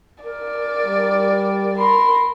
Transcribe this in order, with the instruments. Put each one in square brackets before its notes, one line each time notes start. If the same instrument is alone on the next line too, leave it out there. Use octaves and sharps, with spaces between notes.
[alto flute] A#4 [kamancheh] D5
[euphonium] G3
[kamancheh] A#4 C6 [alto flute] B5